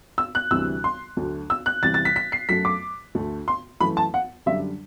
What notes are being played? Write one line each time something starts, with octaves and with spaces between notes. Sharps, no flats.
E6
F#6
D2 C3 E3 G3 E6
C6
D2 D3 F#3 A3
E6
F#6
E2 C3 E3 G3 A6
A6
B6
B6
C7
F#2 F#3 A3 B6
D6
D2 D3 A3
C6
F#2 E3 A3 B5
A5
F#5
F#2 D3 G3 E5